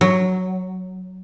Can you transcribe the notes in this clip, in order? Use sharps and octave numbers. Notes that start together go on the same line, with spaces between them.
F#3